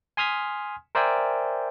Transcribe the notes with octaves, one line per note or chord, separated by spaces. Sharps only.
G#5 C6 D#6 F6 G#6 B6
A#4 C5 D5 E5 G5 G#5